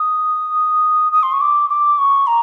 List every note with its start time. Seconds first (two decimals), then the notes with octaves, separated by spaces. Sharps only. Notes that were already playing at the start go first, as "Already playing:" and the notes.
Already playing: D#6
1.12 D#6
1.23 C6
1.32 C#6
1.41 D6
1.70 D6
1.98 C#6
2.27 A#5